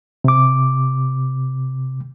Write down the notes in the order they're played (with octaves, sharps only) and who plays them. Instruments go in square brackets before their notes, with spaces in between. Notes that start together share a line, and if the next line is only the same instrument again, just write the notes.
[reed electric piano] C3 D6